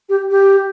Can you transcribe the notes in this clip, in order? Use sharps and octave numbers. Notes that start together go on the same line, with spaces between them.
G4
G4